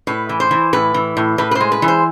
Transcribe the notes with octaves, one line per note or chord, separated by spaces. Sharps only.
A2 B4
E3
C5
E3
A2 B4
E3
A2
A2 B4
B4
C5
G#3
B4
E3
C5